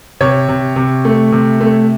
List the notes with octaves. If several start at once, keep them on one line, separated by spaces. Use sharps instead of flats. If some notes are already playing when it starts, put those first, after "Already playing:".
C3 C#5
C3
C3
A3
C3
A3